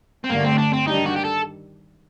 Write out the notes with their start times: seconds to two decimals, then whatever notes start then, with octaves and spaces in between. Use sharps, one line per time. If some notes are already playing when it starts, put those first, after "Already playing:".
0.24 C4
0.30 G2 D3 A3 A#3
0.44 C4
0.58 D4
0.73 C4
0.86 D#3 G3 D4 D#4 G4
1.06 F#4
1.16 G4
1.24 A4